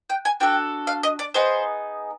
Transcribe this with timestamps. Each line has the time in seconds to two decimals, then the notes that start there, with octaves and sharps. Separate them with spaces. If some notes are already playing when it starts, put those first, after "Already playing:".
0.10 G5
0.25 G#5
0.40 D4 F#4 A4 G5
0.87 F5
1.03 D#5
1.19 D5
1.34 B3 D#4 G#4 C5